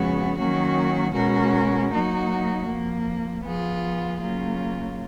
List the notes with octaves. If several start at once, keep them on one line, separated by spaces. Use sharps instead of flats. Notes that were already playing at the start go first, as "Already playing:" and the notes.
Already playing: F2 C#3 G#3 B3 F#4
D#3 F#3 A#3 C#4 F#4
B2 G#3 C#4 F#4 A#4
F#3 A#3 D#4 F#4
F2 F3 A#3
F3 B3 F4 G#4
C#3 F#3 A#3 F4